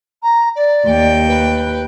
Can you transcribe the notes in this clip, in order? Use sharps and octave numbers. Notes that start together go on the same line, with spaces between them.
A#5
D5
D#2 G5
B4